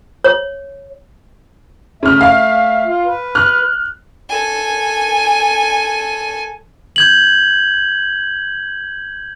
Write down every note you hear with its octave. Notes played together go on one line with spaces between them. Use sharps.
C#5
C#3 A3 E5 F6
F5
F4
B4
F6 F#6
A4 G#5
G6 G#6 F#7